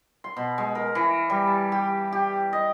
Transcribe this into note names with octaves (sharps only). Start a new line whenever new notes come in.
C6
B2
G#3
A#4
E3
G3
A5
G4
G4
D#5